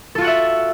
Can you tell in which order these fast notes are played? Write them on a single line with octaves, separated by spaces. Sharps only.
A4 F4 F#4 F#5 E5